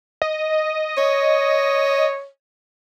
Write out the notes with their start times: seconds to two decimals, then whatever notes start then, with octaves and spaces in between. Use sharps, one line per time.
0.22 D#5
0.97 C#5